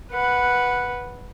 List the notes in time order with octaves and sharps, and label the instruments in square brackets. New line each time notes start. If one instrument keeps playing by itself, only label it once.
[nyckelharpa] B4 F#5